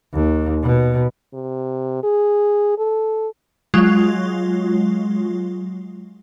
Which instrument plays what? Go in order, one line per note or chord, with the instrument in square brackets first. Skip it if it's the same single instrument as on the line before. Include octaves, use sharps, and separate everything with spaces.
[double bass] D#2
B2
[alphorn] C3
G#4
A4
[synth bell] F#3 G#3 F4